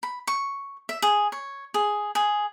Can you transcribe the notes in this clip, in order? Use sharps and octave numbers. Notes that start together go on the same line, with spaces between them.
B5
C#6
E5
G#4
C#5
G#4
G#4